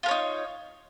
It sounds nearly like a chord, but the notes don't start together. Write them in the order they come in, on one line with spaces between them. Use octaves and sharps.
F4 A#4 C#5 D#4